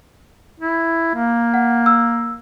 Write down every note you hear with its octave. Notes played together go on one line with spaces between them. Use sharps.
E4
A#3
F#5
E6